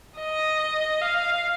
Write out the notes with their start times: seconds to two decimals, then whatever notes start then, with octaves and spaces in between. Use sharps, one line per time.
0.17 D#5
1.02 F5